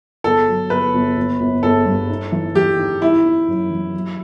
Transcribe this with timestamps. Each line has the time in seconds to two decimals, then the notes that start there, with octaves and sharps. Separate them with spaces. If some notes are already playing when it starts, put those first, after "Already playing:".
0.24 G1 A4
0.48 F#3
0.70 G1 B4
0.94 G1
1.17 G1
1.40 G1
1.63 G1 A4
1.86 G2
2.09 D#4
2.32 E3
2.55 E3 G4
2.79 D#4
3.01 G3 E4
3.25 D#4
3.48 F#2
3.71 E3
3.95 F#3